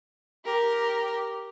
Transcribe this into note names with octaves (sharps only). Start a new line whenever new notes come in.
G4 A#4